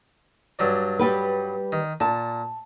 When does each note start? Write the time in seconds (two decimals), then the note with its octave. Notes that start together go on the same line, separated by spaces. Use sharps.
0.59 G2 F#3 D5
0.99 G3 G4 B4
1.72 D#3
2.00 A#2 A5